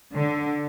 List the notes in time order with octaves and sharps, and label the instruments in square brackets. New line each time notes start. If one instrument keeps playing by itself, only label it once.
[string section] D3